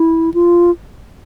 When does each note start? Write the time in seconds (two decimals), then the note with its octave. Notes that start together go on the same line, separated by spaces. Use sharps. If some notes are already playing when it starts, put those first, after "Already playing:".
Already playing: E4
0.34 F4